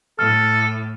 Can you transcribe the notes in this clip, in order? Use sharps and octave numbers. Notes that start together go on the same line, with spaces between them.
A2 A4 F6